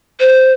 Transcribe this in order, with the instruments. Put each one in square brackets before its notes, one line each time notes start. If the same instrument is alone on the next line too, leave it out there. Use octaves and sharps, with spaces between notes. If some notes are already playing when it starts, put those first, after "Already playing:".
[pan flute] C5